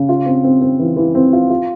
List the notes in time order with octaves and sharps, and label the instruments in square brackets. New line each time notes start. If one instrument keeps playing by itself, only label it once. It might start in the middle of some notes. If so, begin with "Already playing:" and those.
Already playing: [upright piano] C#3
F4
C4
C4
C4
E3
E3
C4
F4
F4